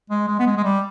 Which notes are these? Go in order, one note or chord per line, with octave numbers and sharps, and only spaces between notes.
G#3
G#3
B3
G#3
G#3
G3